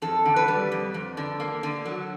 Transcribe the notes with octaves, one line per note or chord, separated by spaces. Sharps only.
F2 A4
D3
B4
G3
F2
F2
D3
A#3
D3
F#3